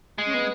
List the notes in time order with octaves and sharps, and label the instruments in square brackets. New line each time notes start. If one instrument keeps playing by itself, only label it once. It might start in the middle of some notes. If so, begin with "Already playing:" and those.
[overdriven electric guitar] G#3
[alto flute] C#4
B3